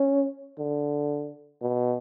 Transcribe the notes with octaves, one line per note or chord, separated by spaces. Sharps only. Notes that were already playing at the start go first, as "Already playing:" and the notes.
Already playing: C#4
D3
B2